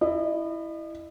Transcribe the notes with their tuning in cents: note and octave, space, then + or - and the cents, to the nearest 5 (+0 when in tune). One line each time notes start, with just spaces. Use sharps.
E4 +0 D#5 -40